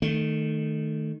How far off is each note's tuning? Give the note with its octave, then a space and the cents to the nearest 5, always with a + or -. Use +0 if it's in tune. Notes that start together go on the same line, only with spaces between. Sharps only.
D#3 -5 A3 +5